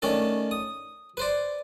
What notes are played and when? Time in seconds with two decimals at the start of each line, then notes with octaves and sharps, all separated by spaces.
0.02 D#3 A3 C#4 D4 A4
0.51 D#6
1.17 B4 C5 D5